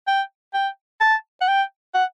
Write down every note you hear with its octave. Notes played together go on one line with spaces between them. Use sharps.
G5
G5
A5
F#5
G5
F#5